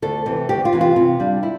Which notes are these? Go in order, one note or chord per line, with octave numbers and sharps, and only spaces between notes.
D2 A4
C3 E3
D2 G4
F4
C3 E3
F4
C3
G3 D4
E4